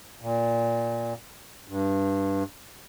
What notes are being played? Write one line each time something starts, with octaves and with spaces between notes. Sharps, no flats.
A#2
G2